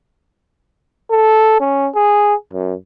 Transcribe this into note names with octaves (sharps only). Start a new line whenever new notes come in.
A4
C#4
G#4
F#2